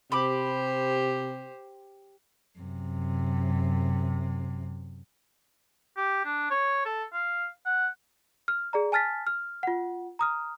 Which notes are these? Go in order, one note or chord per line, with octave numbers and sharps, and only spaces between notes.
C3 G4 C5 B5 D6
F#2 C3
G4
D4
C#5
A4
F5
F#5
F6
G#4 D5 A#5
G#5 A5 F6 A6 B6
F6
F4 F#5
A#5 D#6 F6